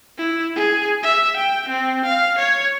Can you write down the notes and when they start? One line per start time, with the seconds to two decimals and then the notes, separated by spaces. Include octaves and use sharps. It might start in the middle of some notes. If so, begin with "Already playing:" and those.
0.18 E4
0.56 G#4
1.03 E5
1.37 G5
1.69 C4
2.05 F5
2.39 C#5